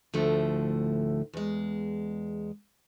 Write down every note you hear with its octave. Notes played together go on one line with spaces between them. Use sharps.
D2 A2 D3 F3 A3
E2 G#3